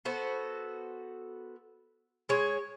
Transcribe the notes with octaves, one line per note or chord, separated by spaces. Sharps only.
B3 F#4 A4 C5
G#3 C#5